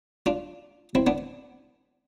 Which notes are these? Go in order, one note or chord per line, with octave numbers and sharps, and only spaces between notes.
D4 F4
C4 E4
B3 D4